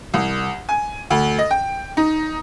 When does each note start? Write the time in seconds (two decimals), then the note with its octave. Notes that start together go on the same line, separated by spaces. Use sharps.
0.14 C2
0.69 G#5
1.10 D2
1.39 D#5
1.51 G5
1.97 D#4